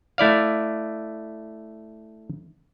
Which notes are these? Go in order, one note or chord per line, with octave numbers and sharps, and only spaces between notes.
A3 E4 D5 F5